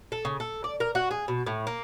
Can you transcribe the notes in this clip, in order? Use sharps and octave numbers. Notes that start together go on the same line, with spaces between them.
A4
C#3
A4
D5
A#4
F#4
G#4
B2
A2
A#3